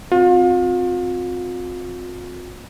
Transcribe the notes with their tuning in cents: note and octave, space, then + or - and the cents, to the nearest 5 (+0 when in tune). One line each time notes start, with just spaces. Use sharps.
C4 +0 F4 +40